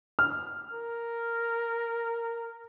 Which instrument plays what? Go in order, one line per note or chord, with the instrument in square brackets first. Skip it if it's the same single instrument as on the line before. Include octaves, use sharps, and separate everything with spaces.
[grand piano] F6
[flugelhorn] A#4